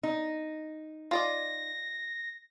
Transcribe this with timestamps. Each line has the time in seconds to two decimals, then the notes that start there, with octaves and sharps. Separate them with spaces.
0.03 D#4
1.11 F4 D5 D#5 A#6